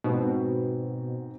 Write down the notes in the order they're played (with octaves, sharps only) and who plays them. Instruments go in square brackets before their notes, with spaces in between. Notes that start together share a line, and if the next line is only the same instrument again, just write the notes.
[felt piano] G#2 C4 [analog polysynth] B2